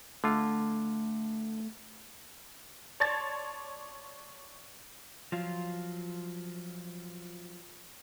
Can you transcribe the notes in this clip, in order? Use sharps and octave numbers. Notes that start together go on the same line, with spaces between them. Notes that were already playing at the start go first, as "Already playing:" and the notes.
D3 A3 F4
C#5 D5 A5 C6 G#6 A6
F3 F#3 F4